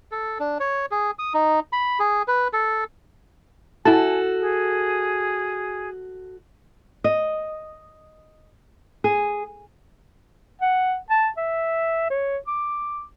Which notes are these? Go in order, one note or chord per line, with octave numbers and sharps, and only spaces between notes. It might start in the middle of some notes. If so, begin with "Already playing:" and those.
A4
D4
C#5
G#4
D#6
D#4
B5
G#4
B4
A4
E4 F#4 A4 G#5 A5
G#4
D#5
G#4
F#5
A5
E5
C#5
D6